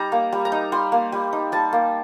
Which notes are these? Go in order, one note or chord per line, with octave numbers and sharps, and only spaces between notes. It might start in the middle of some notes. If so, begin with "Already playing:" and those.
Already playing: G3 D#4 A#5
A#3
G3
A#5
D#4
G3 C6
A#3
G3
D#4
G3 A5
A#3